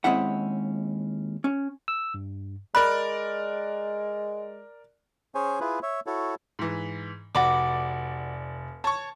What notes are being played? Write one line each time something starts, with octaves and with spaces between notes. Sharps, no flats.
D#2 G#3 C4 C#4 E4 F#5
C#4
E6
G2
G#3 A#4 D5 B5 F#6
C#4 G#4 C5 C#5 G#5
E4 F4 G#4 B4
C#5 E5
E4 F#4 A4 C#5
G#2 E3
F1 F#4 D5 B5 D6
C#5 A5 C#6